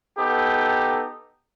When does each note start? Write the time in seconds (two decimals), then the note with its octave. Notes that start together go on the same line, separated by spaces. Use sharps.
0.18 B3 D#4 G4 A4